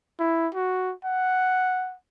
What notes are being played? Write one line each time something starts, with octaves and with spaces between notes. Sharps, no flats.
E4
F#4
F#5